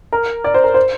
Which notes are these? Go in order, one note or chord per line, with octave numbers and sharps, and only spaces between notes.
A#4
D5
C5
A#4
C5